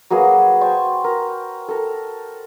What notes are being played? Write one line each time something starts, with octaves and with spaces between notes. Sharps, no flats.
F#3 A#3 B3 G#4
C5 G5 A5 C#6
A#4
A4 A#4